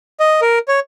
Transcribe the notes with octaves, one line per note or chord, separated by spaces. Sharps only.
D#5
A#4
C#5